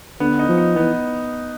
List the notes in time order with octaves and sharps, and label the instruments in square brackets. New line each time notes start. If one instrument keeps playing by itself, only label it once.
[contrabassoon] D3 [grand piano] B3
[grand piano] D#4
[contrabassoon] F3
[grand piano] D#4
[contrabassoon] E3 [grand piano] B3